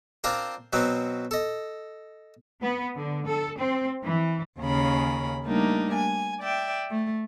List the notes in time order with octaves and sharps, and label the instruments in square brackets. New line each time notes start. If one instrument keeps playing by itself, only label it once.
[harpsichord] C4 D4 F4 A#4 C5
B2 F#3 B3 C4
A4 D#5
[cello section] B3
D3
A4
C4
E3
[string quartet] D#2 C#3 C#4 A#4 B5
G3 A3 A#3 D4 D#4
G#5
D5 E5 G5
A3